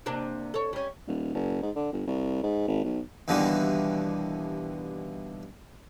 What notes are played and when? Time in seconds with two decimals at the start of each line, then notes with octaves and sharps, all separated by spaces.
0.06 C3 A#3 D4
0.54 A4 C#5
0.73 G3 C#4
1.07 D#1
1.34 F#1
1.62 G#2
1.76 D3
1.93 G1
2.07 C2
2.43 G#2
2.68 G#1
2.84 B1
3.28 D#2 B2 D3 E3 G3